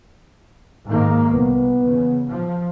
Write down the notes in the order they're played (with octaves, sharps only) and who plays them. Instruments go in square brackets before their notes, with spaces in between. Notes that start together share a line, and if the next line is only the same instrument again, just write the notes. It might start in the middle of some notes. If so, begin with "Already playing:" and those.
[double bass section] G#2 D#3 A#3
[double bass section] C2 [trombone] B3
[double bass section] E2 C#3
F3